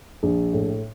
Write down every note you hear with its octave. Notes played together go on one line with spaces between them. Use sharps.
A#1
A2